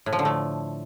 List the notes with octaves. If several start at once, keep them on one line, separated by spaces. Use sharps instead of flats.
A2
F3
D3
A3